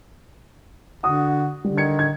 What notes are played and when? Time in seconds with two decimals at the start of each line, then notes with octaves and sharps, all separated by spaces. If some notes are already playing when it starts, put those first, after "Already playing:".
1.04 D3 F#4 D#6
1.64 D3 G3
1.78 D#3 G#6 C#7
1.99 G#6